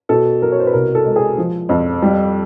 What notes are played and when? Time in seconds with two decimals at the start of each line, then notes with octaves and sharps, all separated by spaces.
0.09 B2 A4
0.42 F#3 A#4
0.52 C#5
0.60 C5
0.67 B4
0.73 C2 A#4
0.95 A4
1.05 G#3
1.16 G#4
1.38 F3
1.69 F2
2.02 G3